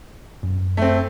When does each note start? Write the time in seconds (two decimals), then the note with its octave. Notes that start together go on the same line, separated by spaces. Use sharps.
0.43 F#2
0.77 A3 C4